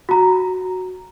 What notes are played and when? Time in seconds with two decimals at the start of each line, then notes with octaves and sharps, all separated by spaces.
0.09 F#4 A#5